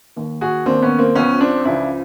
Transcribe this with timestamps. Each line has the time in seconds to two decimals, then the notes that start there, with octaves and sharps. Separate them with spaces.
0.16 D#2 D#3
0.41 F#4 G#4
0.66 D#2 D#3 C4 D4
0.82 B3 C#4
0.98 A#3 C4
1.15 C#2 C#3 F3 B3 C#4
1.40 C4 D4
1.65 C#2 C#3 F3 D4 E4